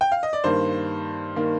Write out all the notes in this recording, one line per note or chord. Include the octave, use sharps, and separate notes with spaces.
G5
F5
D#5
D5
G2 D#3 A#3 C5
D#3 A#3